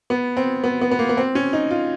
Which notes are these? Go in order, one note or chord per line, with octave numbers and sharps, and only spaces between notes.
B3
C4
B3
B3
B3
A#3
B3
C4
C#4
D#4
F4